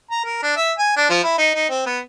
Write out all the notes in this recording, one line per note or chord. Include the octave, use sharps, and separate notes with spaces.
A#5
A#4
D4
E5
G#5
D4
F3
E4
D#4
D#4
C4
B3